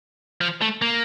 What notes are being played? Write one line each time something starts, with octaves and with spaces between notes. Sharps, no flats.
F3
A3
A#3